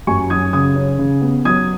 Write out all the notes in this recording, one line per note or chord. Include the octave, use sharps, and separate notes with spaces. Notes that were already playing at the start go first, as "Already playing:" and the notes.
F#2 G#5 C#6
F#3 D#6 G#6
C#3 D#6 G#6
C#4
C#3
B3
F#3 D#6 G#6